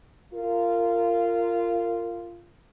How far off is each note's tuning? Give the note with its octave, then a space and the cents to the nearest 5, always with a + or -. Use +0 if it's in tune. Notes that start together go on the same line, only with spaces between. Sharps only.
F4 -15 A#4 -25